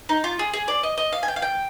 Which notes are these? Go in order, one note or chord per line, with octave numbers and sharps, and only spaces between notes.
D#4
F4
G#4
G#4
D5
D#5
D#5
F5
G#5
G5
F5
G5